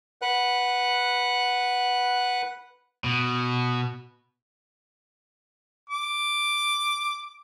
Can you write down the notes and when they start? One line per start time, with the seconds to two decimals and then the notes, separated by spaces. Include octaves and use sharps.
0.22 B4 F#5 F#6
3.04 B2
5.89 D6